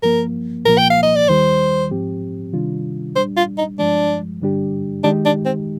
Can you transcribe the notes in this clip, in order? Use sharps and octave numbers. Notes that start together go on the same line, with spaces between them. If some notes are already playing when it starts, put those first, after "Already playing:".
G2 F3 A#3 A#4
C2 A#2 F3 A#3 A#4
G5
F5
D#5
D5
D#2 D#3 G3 C5
G#2 F3 C4 G4
C3 D#3 G3 D4 F4
A#2 G3 D4 C5
F4
D#4
G2 F3 G#3 D4
G2 D3 G3 D4 G4
D#3 G#3 D4 D#4 G4
D4
C4